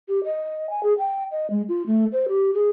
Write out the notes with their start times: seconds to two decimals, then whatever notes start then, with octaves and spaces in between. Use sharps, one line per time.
0.09 G4
0.24 D#5
0.70 G#5
0.83 G#4
0.99 G5
1.31 D#5
1.50 G#3
1.69 F4
1.87 A3
2.13 C5
2.29 G4
2.54 G#4